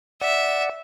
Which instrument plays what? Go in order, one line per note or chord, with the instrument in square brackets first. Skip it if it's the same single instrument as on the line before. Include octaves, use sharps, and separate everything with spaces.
[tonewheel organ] D5 F#5 [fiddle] E5